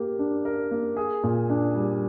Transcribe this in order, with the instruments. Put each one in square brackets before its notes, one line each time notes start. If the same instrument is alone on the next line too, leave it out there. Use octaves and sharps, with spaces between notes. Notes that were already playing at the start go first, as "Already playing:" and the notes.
Already playing: [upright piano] A#3 G4 A#4
D4
A#4
A#3
G#4
A#2
D4
G3